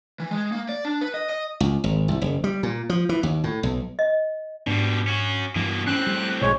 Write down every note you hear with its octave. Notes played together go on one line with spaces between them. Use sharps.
E3
G#3
A#3
D5
D4
B4
D#5
D#5
C#2
G#1
C2
F#1
G3
A#2
F3
E3
D#2
A2
B1
D#5
G#2 B2 G3 D4
C#4 F#4
G2 B2 E3 A#3
A2 C4 C#4 F#6
G3
A#1 B2 G#3 C#5